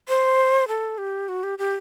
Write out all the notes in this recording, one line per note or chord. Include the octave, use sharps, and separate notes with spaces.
C5
A4
G4
F#4
G4
G4